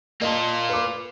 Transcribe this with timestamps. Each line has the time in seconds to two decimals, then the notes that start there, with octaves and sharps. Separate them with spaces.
0.22 A#3 F4 D#5 A5
0.69 B4 D6